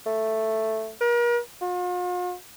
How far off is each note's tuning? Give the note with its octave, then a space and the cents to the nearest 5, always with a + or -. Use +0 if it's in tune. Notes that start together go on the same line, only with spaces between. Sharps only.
A3 +5
A#4 +40
F4 +45